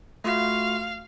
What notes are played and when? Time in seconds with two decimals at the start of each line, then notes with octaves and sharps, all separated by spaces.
0.24 A3 F4 F#4 F5